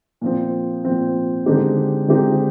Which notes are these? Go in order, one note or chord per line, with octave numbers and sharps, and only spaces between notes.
A#2 F3 C4
A#2 F3 C4
D3 G#3 C4 D#4 G4
D3 G#3 C4 D#4 G4